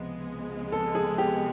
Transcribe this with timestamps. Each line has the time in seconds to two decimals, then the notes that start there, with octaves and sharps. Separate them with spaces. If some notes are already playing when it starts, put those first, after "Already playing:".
Already playing: C#2 C3 F3 G#3 B3
0.72 A4
0.95 G#4
1.18 G4